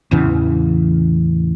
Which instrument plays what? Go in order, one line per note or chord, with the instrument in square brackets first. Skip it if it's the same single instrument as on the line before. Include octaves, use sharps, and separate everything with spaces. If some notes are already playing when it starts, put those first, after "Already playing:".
[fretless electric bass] A1 E2 C#3 E3